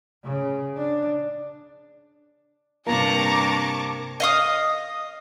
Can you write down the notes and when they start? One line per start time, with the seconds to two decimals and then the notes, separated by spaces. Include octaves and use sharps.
0.24 C#3
0.77 D4
2.87 G2 C3 A#3 A5 A#5 C#6 D6
4.20 D#5 F5 D#6